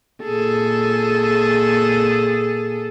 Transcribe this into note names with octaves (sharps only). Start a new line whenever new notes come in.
A#2 G#4 A4